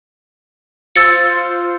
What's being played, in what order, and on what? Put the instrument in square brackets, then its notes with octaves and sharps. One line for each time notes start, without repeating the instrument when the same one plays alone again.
[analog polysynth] F4 C5 [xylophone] E6 A6 C#7